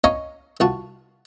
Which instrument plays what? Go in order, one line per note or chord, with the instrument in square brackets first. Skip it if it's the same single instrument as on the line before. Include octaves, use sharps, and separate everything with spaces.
[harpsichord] C#4 D#5 F5 G#5 A#5 C#6
C2 F4 F#4 A5